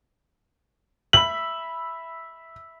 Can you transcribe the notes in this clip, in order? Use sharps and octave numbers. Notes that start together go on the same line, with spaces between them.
E5 B5 F#7